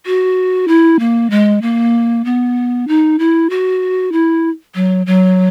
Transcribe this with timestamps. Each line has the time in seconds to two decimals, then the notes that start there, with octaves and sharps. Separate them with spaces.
0.06 F#4
0.68 E4
0.99 A#3
1.30 G#3
1.62 A#3
2.25 B3
2.88 D#4
3.19 E4
3.50 F#4
4.12 E4
4.75 F#3
5.06 F#3